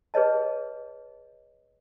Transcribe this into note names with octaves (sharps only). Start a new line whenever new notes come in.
G#4 B4 C#5 D#5 A5